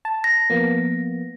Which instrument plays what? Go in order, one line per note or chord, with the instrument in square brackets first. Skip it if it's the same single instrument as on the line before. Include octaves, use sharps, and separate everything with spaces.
[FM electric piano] A5
[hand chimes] A#6
[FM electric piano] F3 A#3 B3